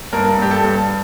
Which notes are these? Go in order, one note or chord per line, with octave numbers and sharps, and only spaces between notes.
G2 A#4
G2 G4
A4
G2